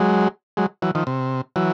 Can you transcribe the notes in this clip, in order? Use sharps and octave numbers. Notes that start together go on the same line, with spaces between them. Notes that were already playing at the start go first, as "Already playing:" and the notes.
Already playing: F#3 G#3
F#3 G#3
E3 F#3
D#3 F3
C3
E3 F#3